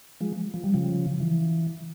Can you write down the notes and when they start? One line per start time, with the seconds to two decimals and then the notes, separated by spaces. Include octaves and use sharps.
0.21 F3 G#3
0.54 F3
0.64 G3
0.74 C#3 F3
1.20 E3